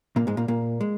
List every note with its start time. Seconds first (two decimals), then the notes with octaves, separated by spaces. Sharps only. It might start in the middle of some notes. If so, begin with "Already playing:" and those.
0.16 A#2 A#3
0.27 G#2 G#3
0.37 A#2 A#3
0.48 A#2 A#3
0.81 G#3